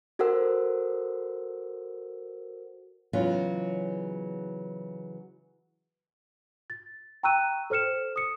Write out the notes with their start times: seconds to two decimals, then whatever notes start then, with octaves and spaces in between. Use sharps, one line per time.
0.19 F#4 A4 A#4 C5 F#5 E6
3.13 C#3 E3 F#3 G#3 B3 F4
6.70 A6
7.23 G5 A#5 C#6 E6 F#6 D#7
7.70 A4 C5 F6 C#7 E7
8.16 D#6 C#7